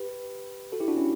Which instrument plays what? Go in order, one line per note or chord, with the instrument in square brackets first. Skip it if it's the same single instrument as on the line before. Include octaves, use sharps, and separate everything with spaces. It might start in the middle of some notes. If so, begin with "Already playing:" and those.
Already playing: [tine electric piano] G4 B4
F#4 A4
E4 G4
D4 F#4
C#4 E4